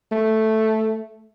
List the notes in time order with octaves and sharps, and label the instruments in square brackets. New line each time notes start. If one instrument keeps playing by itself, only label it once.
[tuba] A3